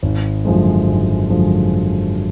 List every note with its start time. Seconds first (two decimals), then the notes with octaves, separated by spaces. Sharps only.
0.03 G#1
0.45 F#2 D3 F3 G#3
0.87 G#1
1.29 F#2 D3 F3 G#3